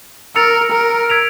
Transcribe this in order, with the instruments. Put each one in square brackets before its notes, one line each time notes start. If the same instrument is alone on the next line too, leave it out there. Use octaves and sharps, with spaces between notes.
[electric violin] A#4 [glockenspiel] E6 A6 C#7 F7
[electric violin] A#4
[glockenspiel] E6 G#6 B6 D7 F7